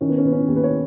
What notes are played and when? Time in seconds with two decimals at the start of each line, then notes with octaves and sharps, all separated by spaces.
0.01 D#3 C#4
0.09 B3
0.18 C#4
0.24 D#3 B3
0.32 C#4
0.48 D#2
0.56 B4
0.64 C#5